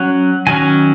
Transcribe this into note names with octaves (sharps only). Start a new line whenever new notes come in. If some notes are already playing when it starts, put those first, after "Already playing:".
Already playing: F#3 C#4 F#5
D#3 F#3 C#4 G#5